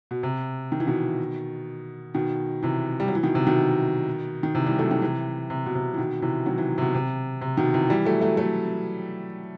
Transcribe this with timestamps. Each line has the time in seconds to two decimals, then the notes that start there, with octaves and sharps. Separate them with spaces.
0.11 B2
0.23 C3
0.72 D#3
0.80 E3
0.87 B2 D#3
2.14 B2 D#3
2.62 C3 E3
3.00 G3
3.08 F#3
3.15 E3
3.23 B2 D#3
3.35 C3
3.47 B2 D#3
4.43 D#3
4.55 C3 E3
4.66 E3 G3
4.79 F#3 A3
4.91 D#3 F#3
5.02 C3 E3
5.50 C3
5.66 B2
5.75 C3
5.94 E3
5.98 B2 D#3
6.22 C3 E3
6.46 D#3 F#3
6.58 C3 E3
6.78 C3
6.82 B2
6.95 C3
7.41 C3
7.57 B2 D#3
7.74 C3 E3
7.90 E3 G3
8.05 F#3 A3
8.21 F#3 A3
8.37 F#3 A3